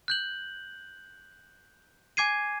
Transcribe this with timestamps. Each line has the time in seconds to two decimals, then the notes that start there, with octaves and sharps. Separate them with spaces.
0.08 F#6 G6 F#7
2.17 G#5 D6 G#6 C7 D#7